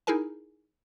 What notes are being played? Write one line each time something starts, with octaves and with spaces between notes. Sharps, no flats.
D#4 E4 G#4 A#4 G#5